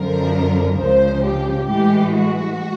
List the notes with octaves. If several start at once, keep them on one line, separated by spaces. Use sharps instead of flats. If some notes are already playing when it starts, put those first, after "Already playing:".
Already playing: F#2 D3 F3 A#4
C#2 C#3 F3 C5
G4
A2 E3 G#3 G4
F#4